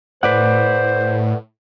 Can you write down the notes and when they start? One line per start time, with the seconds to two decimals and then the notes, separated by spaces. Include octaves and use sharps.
0.23 A2 B4 C5 D5 F#5